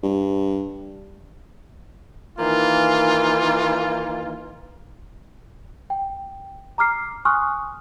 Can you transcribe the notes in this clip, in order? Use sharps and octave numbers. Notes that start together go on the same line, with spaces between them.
G2
D#3 E3 A#3 F4
G5
A#5 D6 F6 C7
G#5 C6 C#6 D#6 F6 F#6